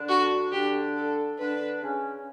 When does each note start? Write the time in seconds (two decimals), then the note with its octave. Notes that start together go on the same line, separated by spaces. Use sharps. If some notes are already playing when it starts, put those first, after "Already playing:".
Already playing: D3 D4
0.09 F#4
0.52 D3 D4 G4
0.96 A4
1.39 D3 D4 B4
1.82 C#3 C#4